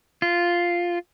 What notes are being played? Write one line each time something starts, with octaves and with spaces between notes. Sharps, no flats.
F4